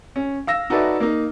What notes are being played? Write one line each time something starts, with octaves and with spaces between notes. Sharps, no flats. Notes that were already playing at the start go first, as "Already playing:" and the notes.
C#4
F5 E6 A#6
D#4 F#4 A4 B4 D5 E5
A#3 D#4